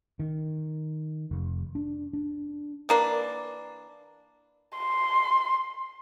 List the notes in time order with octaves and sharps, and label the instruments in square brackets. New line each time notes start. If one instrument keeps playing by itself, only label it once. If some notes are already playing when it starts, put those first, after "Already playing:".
[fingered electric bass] D#3
F1
D4
D4
[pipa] E3 A#3 D4
[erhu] C6